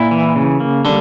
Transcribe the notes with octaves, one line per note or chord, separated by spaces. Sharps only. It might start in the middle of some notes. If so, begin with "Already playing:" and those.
Already playing: A#2 E4
E3
C#3
A#3
D3 G3